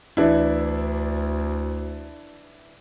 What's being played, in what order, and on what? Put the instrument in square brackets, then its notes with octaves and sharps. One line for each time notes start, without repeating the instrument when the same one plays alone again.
[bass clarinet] D2 [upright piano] E3 D4 E4